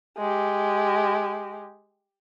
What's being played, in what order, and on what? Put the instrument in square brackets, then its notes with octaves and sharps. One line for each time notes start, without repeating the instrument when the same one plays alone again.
[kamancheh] G#3 G4